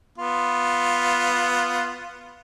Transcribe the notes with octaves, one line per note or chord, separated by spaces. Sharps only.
B3 F4